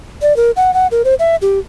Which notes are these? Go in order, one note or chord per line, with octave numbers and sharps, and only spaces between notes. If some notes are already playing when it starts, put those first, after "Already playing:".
D5
A#4
F#5
F#5
A#4
C5
E5
G4